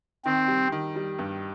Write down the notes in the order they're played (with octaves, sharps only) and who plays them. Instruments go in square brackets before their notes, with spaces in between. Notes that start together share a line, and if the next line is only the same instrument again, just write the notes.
[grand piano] D#3 [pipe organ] C4
[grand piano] G3
D#3
G3
G2